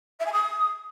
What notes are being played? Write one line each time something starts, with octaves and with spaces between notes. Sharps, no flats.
E5
G#5
D#6